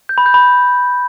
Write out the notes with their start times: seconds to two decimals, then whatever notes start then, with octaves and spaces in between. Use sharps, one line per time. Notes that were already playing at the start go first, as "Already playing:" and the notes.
0.09 G6
0.18 B5
0.26 G6
0.34 B5